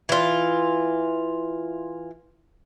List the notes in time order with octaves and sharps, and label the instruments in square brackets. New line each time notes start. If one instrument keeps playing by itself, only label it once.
[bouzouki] E3 F4